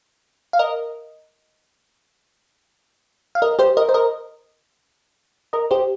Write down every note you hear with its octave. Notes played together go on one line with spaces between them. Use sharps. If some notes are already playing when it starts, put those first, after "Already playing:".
F5
A#4 D#5
F5
A#4 D#5
G4 C5
A#4 D#5
C5
A#4 D#5
A#4 D#5
G4 C5